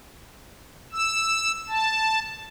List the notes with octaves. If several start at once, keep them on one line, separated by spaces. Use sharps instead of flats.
E6
A5